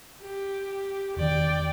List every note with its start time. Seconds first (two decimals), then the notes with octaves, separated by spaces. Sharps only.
0.21 G4
1.17 E1 D#3 D5 G5